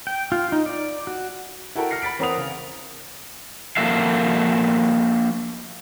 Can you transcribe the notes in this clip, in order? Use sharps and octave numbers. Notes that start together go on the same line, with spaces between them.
G5
F4
D#4
D5
F#4
E4 F#4 A4 A#4 G5
F6 A#6 C7 C#7
B5 A6 B6 D7
E3 C4 A#4 F#5 D#6 F7
C#3
F3 A#3 F#4 A4 E5 F5